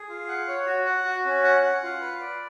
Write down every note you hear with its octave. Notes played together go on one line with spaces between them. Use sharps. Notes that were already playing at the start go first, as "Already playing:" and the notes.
Already playing: G#4
F4
F#5
C#5
F#4
F#5
F#4
C#4
F#5
F#5
F4
B4
D5